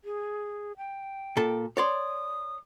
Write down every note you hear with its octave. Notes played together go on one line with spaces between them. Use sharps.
G#4
G5
A#2 A4 A5
C#5 D5 C6 D#6